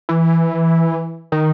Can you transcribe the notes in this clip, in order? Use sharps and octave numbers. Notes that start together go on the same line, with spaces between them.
E3
D#3